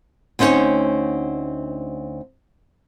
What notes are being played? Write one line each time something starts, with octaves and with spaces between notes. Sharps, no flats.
D2 C4 C#4 D#4 C#5